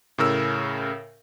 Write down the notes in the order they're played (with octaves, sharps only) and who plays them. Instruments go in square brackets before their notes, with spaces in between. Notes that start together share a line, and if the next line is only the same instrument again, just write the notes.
[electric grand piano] A2 C#3 A#4 E6